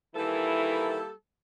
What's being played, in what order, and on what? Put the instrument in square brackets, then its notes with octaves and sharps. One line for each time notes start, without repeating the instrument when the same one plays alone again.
[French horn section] D#3 E3 E4 [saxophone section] G3 A#3 A4